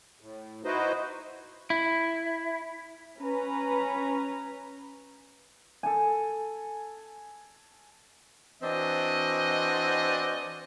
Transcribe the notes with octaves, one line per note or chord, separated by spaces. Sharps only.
A2
D#4 E4 F#4 B4 C5 D#5
E4
C#4 B4 A#5
A4 G#5
E3 C4 D4 F#4 D#5